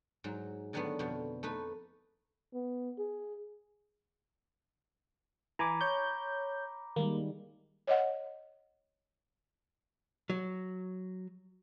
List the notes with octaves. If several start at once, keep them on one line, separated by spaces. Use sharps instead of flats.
G#2 F#3
D3 D#3 F#3 A3 B3
F2 B2
A3 D#4 B4
B3
G#4
E3 G#5 A#5 B5 D6
C#5 G6
D#3 G3 G#3 A#3
C#5 D#5 F#5
F#3